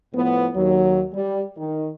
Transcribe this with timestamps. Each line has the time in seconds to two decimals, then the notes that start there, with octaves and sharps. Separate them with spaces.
0.13 A2 F3 B3
0.54 D#2 F#3
1.13 G3
1.56 D#3